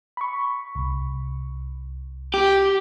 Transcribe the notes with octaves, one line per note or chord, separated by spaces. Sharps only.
B5 C#6
C2
G4